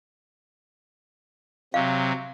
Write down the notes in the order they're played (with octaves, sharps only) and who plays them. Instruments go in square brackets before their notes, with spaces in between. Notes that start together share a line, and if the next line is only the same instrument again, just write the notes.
[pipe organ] C3 F#3 [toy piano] F5